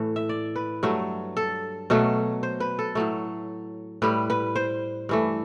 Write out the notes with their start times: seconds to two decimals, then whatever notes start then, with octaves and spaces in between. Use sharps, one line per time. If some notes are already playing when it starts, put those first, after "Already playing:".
Already playing: A2 E3 A3
0.16 E5
0.29 D5
0.56 B4
0.83 G2 F#3 A3
1.37 A4
1.90 B2 F#3 A3
2.43 C5
2.60 B4
2.79 A4
2.95 A2 F#3 A3
4.02 A2 G3 B4
4.30 B4
4.56 C5
5.09 G2 E3 A3